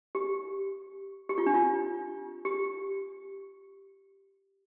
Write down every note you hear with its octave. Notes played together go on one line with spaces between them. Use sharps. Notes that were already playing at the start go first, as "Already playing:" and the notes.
G4
G4
F4
D4
F4
G4